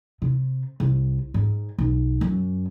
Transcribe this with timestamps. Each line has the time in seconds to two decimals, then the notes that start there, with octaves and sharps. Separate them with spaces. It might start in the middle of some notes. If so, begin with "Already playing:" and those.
0.22 C3
0.80 C2
1.34 G#2
1.78 B1
2.21 F#2